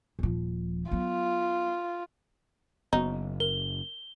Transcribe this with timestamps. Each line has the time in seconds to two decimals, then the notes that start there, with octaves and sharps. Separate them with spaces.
0.19 D#1 F3
0.91 F#3 B3 F4
2.93 F#1 B3 D#4 F#4
3.40 A#4 G7